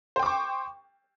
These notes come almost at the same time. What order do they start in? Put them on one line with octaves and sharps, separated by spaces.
C5 G5 D6 C#6